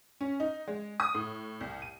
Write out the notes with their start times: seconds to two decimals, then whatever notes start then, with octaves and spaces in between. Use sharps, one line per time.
0.21 C#4
0.40 D#4
0.68 G#3
1.00 D#6
1.15 A2
1.61 C2
1.82 D#7